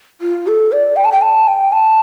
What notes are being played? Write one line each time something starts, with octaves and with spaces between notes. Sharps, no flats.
F4
A4
D5
G5
A5
G5
A5
G5
A5